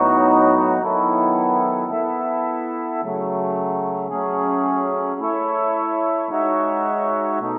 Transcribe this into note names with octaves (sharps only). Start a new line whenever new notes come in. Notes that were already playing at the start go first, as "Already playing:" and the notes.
Already playing: A2 F#3 B3 D#4 F#4
D#3 F#3 B3 E4 A4
B3 E4 A4 E5
C#3 F#3 A3
F#3 A3 C#4 G#4
A3 E4 A4 C#5 E5
G#3 D#4 F#4 C#5 E5
B2 A3 D#4